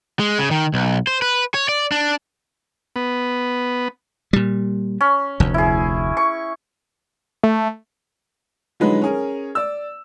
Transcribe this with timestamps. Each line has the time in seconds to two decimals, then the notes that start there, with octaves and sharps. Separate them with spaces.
0.19 G#3
0.39 C#3
0.51 D#3
0.74 B1
1.07 C5
1.22 B4
1.54 C#5
1.69 D5
1.92 D4
2.96 B3
4.33 A#2 G3
5.01 C#4
5.40 F1 D2
5.54 E4 G#4
6.17 C#6
7.43 A3
8.80 D3 F3 F#3 G#3 D#4 B4
9.02 C#4 G#4 A#4
9.55 D5 E6